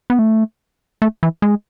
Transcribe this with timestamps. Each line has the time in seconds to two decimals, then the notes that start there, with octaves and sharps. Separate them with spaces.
0.10 B3
0.19 A3
1.02 A3
1.23 E3
1.42 G#3